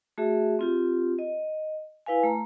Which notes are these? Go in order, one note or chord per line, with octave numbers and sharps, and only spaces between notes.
A3 F#4 G#4 E5
C4 F4 G4
D#5
E4 B4 F5 G#5
A3 A#5